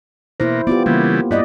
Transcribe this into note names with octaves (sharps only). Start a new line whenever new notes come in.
B2 A#3 E4 C5
B3 F4 G4 D5
C#3 E3 G3 A#3
G2 B3 E4 D5 D#5